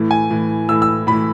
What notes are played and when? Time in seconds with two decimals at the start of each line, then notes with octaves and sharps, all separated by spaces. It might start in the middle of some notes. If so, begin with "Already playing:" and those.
Already playing: A2 E3
0.11 G#5
0.31 A2 E3
0.69 A2 E3 E6
0.82 E6
1.07 A2 B5
1.12 E3